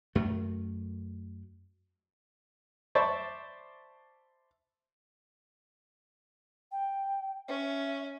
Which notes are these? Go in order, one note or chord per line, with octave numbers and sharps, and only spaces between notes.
F#2 A3
C5 D5 E5 A5 B5 C#6
G5
C#4 E5